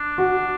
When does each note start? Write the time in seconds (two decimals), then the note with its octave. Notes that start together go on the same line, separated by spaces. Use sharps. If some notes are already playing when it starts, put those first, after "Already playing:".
Already playing: D4
0.18 F#4